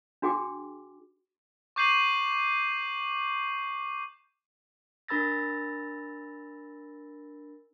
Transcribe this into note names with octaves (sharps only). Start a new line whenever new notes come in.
D4 F#4 G#4 G5 D6
C#6 D6 G6 C7 D#7 F#7
D4 A#4 B5 E6 A6 A#6